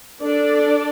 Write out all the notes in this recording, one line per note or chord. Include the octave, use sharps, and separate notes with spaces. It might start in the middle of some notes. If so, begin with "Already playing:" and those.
D4 A4 D5